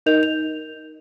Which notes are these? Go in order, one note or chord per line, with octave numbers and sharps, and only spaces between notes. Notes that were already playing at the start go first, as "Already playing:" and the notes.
D#4 A#4 D#5 G6 F7
F7